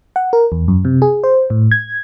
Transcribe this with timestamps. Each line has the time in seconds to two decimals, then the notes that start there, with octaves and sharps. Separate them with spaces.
0.16 F#5
0.33 A#4
0.52 E2
0.68 F#2
0.85 C3
1.02 G#4
1.24 C5
1.50 A2
1.71 G#6